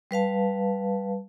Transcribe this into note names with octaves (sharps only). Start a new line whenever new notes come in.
G3 B4 F5 A5